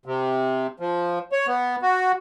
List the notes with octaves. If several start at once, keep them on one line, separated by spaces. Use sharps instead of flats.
C3
F3
C#5
B3
F#4